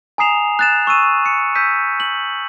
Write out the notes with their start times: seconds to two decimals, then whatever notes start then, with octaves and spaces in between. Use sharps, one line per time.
0.18 G#5 A#5 D#6 C7 E7 F7
0.59 F#6 A6 E7
0.87 C#6 E6 D#7 E7
1.26 C#7
1.55 E6 G6 B6 D#7
2.00 F#7